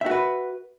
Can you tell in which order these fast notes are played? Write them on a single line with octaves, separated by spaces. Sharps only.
E5 F#4 B4